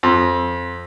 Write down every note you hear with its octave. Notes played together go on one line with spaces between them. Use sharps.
F2